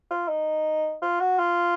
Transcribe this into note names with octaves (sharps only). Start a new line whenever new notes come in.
F4
D#4
F4
F#4
F4